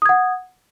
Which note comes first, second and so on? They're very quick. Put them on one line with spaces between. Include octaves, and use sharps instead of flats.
D#6 G#6 F#5